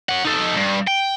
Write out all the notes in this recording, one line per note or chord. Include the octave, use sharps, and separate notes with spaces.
C#4 F#5
D#4 A4
G2
G5